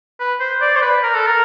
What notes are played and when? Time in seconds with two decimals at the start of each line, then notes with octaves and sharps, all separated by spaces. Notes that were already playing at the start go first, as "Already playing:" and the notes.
0.20 B4
0.40 C5
0.61 D5
0.76 C5
0.82 B4
1.03 A#4
1.14 A4
1.26 A#4